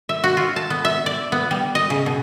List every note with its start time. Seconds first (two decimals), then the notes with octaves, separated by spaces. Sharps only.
0.09 E5
0.24 F#4
0.37 F4
0.56 A5
0.70 B3
0.85 E5
1.06 D5
1.32 B3
1.51 G3
1.75 D#5
1.90 C#3
2.06 B2